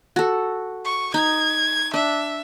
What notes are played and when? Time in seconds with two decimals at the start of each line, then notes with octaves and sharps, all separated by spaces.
0.16 F#4 A4
0.84 C#6
1.14 D#4 G#6
1.94 D4 E5